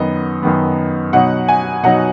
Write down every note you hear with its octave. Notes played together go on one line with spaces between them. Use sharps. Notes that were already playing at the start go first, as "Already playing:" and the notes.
Already playing: F#2 D#3 B3 D#5
F#2 D#3 B3
B2 F#3 D#4 F#5
G#5
B2 F#3 D#4 F#5